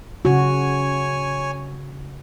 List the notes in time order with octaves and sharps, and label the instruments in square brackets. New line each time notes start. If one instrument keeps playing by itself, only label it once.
[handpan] C#3 F#4 [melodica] C#5 G#5